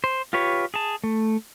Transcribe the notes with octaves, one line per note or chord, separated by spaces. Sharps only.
C5
F4 G4 B4 C#5
G#4 A5
A3